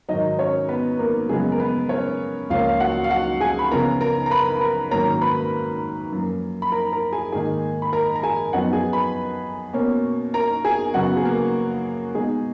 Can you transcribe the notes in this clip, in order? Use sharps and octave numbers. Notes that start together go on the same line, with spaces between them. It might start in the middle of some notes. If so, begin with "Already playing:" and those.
G#2 D#3 F#3 D#4 D#5
C#4 C#5
B3 B4
A#3 A#4
F#2 C#3 F3 G#3 B3 G#4
A#4
B3 B4
C#4 C#5
C#2 C#3 F3 A#3 C#4 F4 F5
F5
F#4 F#5
F5
F#4 F#5
G#4 G#5
B5
C#3 F3 B3 A#4 A#5
A#4 A#5
A#5
B4 B5
B5
A#4 A#5
G#2 D#3 F#3 A#3 C#4 A#4 A#5
B4 B5
F#2 F3 A#3
B5
A#4 A#5
A#4 A#5
G#4 G#5
G#2 D#3 A#3 D#4 G#4 G#5
B5
A#4 A#5
A#5
G#4 G#5
F#2 F3 B3 D#4 F#4 F#5
G#4 G#5
B4 B5
B2 A#3 C#4
A#4 A#5
G#4 G#5
F#2 C#3 F#3 B3 F#4 F#5
G#4
A#3 A#4
B2 G#3 D#4 G#4